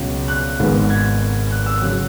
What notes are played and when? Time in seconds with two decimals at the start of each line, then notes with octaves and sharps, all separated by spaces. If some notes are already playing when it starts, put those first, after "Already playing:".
Already playing: C#2 B2 F#3 C#4
0.28 F#6
0.60 G#1 G#2 G#3 B3
0.90 G#6
1.51 F#6
1.66 E6
1.82 C#3 F#3 F#6